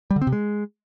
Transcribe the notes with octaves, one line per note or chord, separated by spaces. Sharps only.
G3
D3
C4
C3
G#3